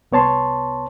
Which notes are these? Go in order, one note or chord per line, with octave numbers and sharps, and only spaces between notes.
C2 B3 C#5 A5 C6